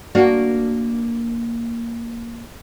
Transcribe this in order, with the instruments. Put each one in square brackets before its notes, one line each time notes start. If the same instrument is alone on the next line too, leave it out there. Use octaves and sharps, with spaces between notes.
[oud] A#3 D4 F#4